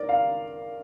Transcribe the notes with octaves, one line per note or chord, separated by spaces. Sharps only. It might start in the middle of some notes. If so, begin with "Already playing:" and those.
Already playing: A#4 D5
F5